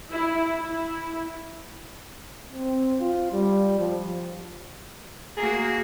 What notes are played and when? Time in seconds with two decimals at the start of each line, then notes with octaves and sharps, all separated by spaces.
0.11 E4
0.57 E4
2.53 C4
3.01 F4
3.32 G3
3.80 F3
5.37 A#3 F#4 G#4